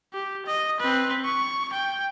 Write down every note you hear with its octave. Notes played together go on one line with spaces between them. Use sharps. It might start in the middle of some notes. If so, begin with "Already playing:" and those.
G4
D#5
C4 B4
C#6
G5